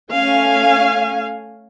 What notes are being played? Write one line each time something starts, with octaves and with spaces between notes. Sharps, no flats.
A3 C#4 F5 G#5